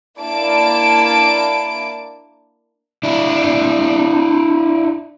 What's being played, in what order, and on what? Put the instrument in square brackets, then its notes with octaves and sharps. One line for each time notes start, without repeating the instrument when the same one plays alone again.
[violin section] A#3 D4 E4 D5 A5 D7
[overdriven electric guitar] D4 E4